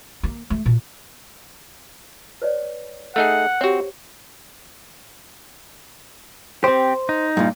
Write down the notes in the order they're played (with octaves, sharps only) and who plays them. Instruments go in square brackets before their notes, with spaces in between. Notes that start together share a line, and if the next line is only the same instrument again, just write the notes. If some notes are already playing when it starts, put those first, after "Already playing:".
[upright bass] A#3
A3
A#2
[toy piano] B4 C#5 D5
[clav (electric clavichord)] A3 D#4 G#4 [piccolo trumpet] F#5
[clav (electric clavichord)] C4 F#4 [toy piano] G4 C5 C#5
[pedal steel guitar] C4 G4 [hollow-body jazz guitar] C5
[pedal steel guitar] D#4
[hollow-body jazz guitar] G2 A#2